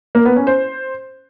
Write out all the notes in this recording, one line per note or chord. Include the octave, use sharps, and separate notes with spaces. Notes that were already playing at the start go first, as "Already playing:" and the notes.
A#3
B3
C#4
C5